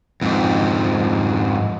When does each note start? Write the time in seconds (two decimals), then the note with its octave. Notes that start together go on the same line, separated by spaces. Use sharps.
0.21 F2 G#2